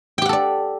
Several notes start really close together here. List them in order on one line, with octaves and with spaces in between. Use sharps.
G5 G4 F#5 A4 D5